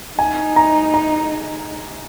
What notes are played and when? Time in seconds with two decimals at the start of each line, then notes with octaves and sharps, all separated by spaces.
0.19 D#4 G#5
0.56 A#5
0.94 A#5